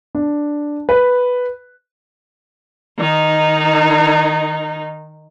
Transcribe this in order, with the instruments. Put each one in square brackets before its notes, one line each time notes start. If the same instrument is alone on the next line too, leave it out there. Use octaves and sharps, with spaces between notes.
[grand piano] D4
B4
[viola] D#3 D#4